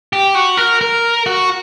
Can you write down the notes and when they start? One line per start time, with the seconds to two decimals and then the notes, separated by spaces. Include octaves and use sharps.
0.13 G4
0.35 F#4
0.57 A#4
0.81 A#4
1.26 F#4